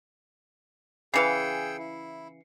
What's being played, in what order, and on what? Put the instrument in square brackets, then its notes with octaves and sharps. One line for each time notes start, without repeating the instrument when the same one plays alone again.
[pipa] C#3 E3 F5 [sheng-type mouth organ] G#4 G5 E6 [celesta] C7 C#7
[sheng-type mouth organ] E4